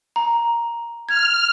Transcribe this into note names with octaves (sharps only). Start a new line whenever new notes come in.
A#5
F6 G#6